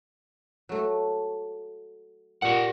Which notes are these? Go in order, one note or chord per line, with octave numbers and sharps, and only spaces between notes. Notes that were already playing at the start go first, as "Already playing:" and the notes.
F#3 A3
A#2 G4 F#5